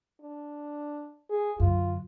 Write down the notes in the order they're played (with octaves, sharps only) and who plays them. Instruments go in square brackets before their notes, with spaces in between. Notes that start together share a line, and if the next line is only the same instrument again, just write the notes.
[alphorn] D4
G#4
[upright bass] F#2 D3 [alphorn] F4